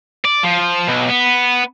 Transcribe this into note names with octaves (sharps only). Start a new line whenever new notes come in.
D5
F3
B1
B3